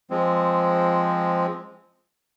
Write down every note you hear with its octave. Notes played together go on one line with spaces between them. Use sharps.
F3 G#3 C4